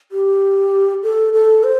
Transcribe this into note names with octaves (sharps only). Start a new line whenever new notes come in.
G4
A4
A4
C5